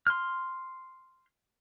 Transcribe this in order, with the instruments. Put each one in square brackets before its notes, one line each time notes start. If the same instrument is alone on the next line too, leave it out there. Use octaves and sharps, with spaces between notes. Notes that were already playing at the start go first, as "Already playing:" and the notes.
[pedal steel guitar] C6 F6